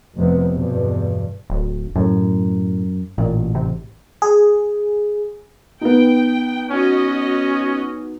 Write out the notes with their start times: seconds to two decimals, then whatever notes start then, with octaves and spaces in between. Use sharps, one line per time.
0.15 F1 C3 B3
0.49 E2 G2 B2
1.50 D1
1.96 F#2 A2
3.18 A1 A#2
3.55 C3
4.22 G#4
5.81 B3 D#4 G5
6.71 C#4 F#4 D#5